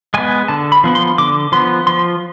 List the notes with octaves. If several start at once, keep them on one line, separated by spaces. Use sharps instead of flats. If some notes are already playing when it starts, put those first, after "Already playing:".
G#3 B3 G#5
D3 A5
B5
F3 B3
C6
D3 D6
F3 B3 C6
F3 C6